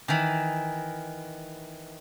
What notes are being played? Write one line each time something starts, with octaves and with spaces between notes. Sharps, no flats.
D#3 E3